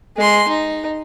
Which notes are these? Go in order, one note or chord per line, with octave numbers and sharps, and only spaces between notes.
G#3 C6
D#4